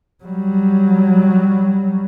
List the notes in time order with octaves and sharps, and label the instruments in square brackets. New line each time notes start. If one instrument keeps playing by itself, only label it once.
[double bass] F#3 G3